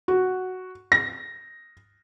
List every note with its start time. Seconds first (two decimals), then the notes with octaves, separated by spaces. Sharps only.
0.08 F#4
0.92 A#6